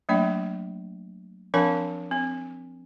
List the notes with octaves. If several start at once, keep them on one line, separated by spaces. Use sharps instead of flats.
F#3 A3 A#3 D4 D5
F3 C4 D4 A#4 F5 A5
C4